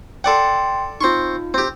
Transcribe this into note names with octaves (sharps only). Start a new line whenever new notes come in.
A4 D5 F#5 G5 C6
C4 D#4 F4 C6 C#6
C4 G4